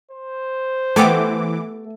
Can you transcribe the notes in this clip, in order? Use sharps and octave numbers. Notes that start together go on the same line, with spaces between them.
C5
E3 A3 B3 G4 A4 D6